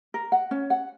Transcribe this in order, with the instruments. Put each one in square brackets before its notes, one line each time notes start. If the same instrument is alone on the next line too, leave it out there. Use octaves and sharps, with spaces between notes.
[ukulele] A#4
F#5
C#4
F#5